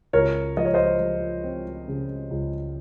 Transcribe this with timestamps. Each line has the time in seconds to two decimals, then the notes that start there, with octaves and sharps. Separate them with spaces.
0.13 C#2 A#4 C#5
0.57 F3 D#5
0.65 C#5
0.74 C5 D#5
1.00 F3
1.44 C4
1.88 C#3
2.31 C#2